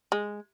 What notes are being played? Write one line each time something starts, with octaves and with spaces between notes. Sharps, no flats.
G#3